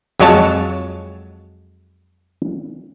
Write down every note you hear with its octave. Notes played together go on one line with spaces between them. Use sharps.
F2 F#3 G#3 C#5 A5